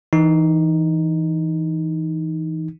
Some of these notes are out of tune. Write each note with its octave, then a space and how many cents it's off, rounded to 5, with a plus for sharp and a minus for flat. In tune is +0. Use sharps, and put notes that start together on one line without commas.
E3 -10 D#4 +0